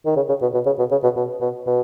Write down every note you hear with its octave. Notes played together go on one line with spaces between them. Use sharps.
D#3
C#3
C#3
B2
B2
C#3
B2
C#3
B2
B2
B2
B2